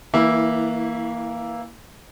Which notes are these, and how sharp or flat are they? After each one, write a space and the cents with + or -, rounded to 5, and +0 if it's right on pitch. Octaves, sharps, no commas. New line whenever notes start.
E3 -25 A#3 +0 E4 +0